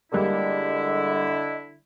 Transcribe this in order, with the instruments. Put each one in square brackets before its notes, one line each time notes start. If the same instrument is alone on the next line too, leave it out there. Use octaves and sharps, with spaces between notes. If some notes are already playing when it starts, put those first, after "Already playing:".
[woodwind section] D3 E4 [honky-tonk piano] G3 G#3 A#3 [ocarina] D#5